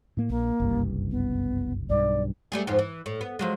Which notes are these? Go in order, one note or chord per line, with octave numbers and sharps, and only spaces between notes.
A2 A#3
A#1 A#3
F#1 C2 G2
B3
B1 G2 D5
G3 A3 G#4
F2 G#2 F3
E3
A2
B3
F3 F#3 G#3